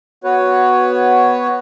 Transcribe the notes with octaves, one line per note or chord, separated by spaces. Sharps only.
B3 F#4 B4 C#5